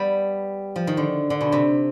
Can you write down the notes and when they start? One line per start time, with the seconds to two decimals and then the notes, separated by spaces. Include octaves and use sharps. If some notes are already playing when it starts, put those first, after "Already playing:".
Already playing: G3 B3
0.76 F3
0.87 D#3
0.97 D3
1.30 D3
1.41 B2
1.52 C3